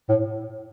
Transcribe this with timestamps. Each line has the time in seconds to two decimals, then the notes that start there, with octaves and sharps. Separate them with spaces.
0.09 A2